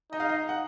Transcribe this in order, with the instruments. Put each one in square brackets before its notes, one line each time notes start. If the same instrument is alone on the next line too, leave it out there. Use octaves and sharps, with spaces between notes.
[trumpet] D#4 [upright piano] D#5
[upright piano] F5
D#5
F#5